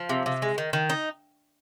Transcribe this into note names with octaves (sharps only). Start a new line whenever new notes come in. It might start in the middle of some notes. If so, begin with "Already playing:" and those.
Already playing: F3
C3
C3
G#3
D#3
D#3
D#4